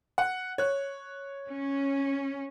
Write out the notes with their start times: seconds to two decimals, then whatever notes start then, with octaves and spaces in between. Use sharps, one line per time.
0.18 F#5
0.58 C#5 F#6
1.49 C#4